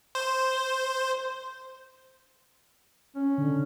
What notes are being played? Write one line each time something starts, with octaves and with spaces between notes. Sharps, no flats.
C5
C#4
D3